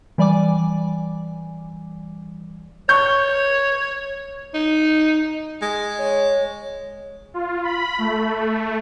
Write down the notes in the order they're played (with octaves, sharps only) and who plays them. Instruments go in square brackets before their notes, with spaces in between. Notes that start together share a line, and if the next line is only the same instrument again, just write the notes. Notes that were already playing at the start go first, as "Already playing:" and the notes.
[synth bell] E3 G3 D5 G#5 D6
[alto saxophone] C#5 [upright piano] C#6 G6
[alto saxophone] D#4
[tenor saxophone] G#3
[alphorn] C#5
[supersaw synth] F4
B5
A3